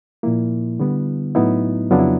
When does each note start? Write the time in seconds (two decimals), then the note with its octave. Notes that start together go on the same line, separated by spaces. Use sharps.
0.23 A#2 F3 A#3 E4
0.79 D3 G3 B3
1.35 A2 F#3 B3 D#4 E4
1.91 F2 C#3 F#3 B3 D4 F4
1.99 E4